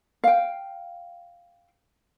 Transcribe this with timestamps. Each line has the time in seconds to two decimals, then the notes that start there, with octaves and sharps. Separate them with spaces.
0.24 F5 G5